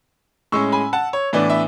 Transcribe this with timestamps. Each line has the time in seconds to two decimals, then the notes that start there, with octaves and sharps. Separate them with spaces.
0.52 A2 G#3 C#4 C#6 E6
0.72 G#5 B5
0.93 F#5 A5
1.13 C#5
1.33 A2 E3 B3 D4 D5
1.50 E5